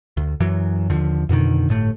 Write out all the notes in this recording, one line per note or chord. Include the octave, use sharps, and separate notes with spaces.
D2
F#2 E3 F#3
D#2 D3 F3
F2 B2 D3 D#3
G1 A2 A3